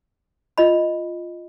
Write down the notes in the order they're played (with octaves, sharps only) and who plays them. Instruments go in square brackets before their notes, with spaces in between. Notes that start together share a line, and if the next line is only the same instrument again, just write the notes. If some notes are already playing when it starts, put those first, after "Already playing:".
[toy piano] F4 D#5 B5